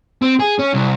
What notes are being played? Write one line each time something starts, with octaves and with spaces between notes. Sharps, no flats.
C4
G#4
C#4
C2